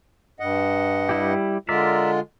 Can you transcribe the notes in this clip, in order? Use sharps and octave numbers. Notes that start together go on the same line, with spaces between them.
G2 D#5 F#5
G3 E4 G4
D3 G#3 F4 A#4 D5 E5